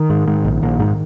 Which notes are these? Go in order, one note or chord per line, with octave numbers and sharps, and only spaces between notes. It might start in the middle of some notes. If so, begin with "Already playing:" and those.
Already playing: D#3
G#2
G#2
A#1
A#1
G#2